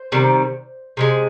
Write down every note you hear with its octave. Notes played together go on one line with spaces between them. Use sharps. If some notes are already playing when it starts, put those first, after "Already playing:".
Already playing: C5
C3 D#3 G3
C3 D#3 G#3